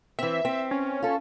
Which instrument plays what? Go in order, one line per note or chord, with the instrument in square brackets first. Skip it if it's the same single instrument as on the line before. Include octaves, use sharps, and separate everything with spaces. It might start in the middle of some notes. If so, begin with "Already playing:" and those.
[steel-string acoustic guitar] E3 C4 [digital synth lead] E5
[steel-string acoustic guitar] C4
[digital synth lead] C#4
[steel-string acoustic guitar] F4 A4